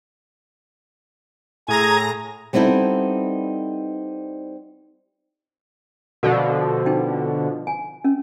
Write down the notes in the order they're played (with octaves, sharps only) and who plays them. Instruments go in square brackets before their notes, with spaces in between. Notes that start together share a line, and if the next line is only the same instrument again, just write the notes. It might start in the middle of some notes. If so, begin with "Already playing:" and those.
[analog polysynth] A2 A#5 A#6 [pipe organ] G#4 D#6 G#6
[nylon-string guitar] G3 B3 C4 D#4 E4 A4
[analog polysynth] B2 D3 F3 [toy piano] F#4 A4
[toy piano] D#4 G5
G#5
C#4